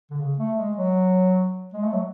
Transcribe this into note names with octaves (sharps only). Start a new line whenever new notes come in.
D3
C#3
A3
G#3
F#3
G#3
A3
F#3